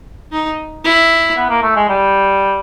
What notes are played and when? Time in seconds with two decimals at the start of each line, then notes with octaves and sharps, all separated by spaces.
0.32 D#4
0.84 E4
1.37 B3
1.50 A#3
1.63 A3
1.76 G#3
1.89 G3